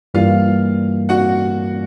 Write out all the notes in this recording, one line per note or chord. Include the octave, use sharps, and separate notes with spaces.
G2 E3 G3 A#3 F4 F5
F#4 F#5